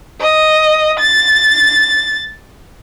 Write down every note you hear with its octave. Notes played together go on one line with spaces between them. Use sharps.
D#5
A6